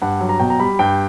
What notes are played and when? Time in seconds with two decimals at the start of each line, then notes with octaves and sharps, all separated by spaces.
0.02 G2 F#5
0.21 F#3
0.29 A#5
0.40 B2 G5
0.50 A#5
0.60 G3 B5
0.79 G2 G5